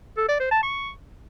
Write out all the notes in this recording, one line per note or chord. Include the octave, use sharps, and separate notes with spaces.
A4
D5
C5
A5
C#6